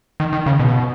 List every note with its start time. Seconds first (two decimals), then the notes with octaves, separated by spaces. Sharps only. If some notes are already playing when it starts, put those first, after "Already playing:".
0.20 D#3
0.33 D#3
0.46 C#3
0.59 B2